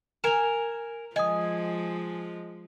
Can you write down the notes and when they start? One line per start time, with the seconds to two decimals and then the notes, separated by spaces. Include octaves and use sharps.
0.24 A#4 G#5 E7 F7
1.16 F3 G#3 D#5 G#5 D#6